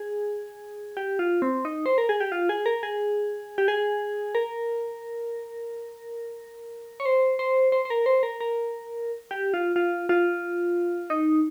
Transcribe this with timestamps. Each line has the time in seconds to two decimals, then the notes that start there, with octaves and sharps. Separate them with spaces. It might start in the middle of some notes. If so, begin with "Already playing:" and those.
Already playing: G#4
0.97 G4
1.19 F4
1.42 C4
1.65 D#4
1.86 C5
1.98 A#4
2.09 G#4
2.20 G4
2.32 F4
2.49 G#4
2.66 A#4
2.83 G#4
3.58 G4
3.68 G#4
4.35 A#4
7.00 C#5
7.05 C5
7.39 C5
7.72 C5
7.85 C5
7.90 A#4
8.06 C5
8.23 A#4
8.41 A#4
9.31 G4
9.54 F4
9.76 F4
10.09 F4
11.10 D#4